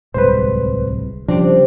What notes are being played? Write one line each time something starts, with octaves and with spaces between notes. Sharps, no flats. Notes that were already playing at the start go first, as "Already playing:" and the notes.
D1 C2 G#3 B4 C5
C#3 F3 G3 C4 D4 G4